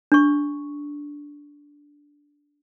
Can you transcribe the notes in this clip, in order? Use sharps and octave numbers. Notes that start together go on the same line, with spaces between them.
D4 C#6